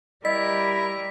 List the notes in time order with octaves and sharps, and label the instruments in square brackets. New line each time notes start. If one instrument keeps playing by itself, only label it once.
[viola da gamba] G3 A#4 [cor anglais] E4 [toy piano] D#5 [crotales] B6